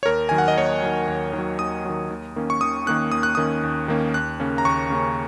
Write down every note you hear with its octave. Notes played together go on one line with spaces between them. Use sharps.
C#5
D#2 A#4
D#3 F#3 G#5
F#5
D#5
D#2 C#5
D#3 F#3
D#2 F#5
D#3
F#3
D#2 D#6
D#3 F#3
D#2
D#3 A#3 C#4
C#6
D#2 D#6
D#3 A#3 C#4 F#6
D#2 D#6
F#6
D#3 A#3 C#4 D#6
D#2
D#3 A#3 C#4
D#2 F#6
C#3 A#3 C#4
A#5
D#2 C#6
C#3 A#3 C#4